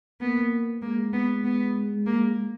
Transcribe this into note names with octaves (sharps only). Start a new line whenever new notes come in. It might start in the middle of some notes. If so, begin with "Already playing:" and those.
A#3 B3
G#3 A#3
B3
B3
A#3